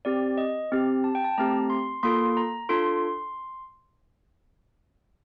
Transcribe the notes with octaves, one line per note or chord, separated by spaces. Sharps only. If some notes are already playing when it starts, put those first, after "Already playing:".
C4 G4 D5
D#5
C4 G4
A5
G5
A5
A3 C4 G4 A#5
C6
A#3 F4 A4 C6
A#5
D4 F4 A4 C6